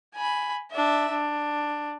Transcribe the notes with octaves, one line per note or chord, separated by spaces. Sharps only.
G#5 B5
D4 E5
D4